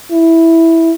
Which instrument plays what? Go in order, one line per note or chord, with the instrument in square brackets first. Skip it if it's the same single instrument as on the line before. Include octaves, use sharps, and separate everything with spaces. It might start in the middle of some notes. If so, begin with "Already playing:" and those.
[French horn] E4